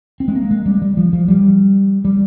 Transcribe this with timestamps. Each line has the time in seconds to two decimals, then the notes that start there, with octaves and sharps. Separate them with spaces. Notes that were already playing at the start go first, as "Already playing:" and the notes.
0.20 C4
0.28 G#3
0.35 A#3
0.51 G#3
0.66 G3
0.82 G3
0.97 F3
1.13 F3
1.28 G3
2.05 G3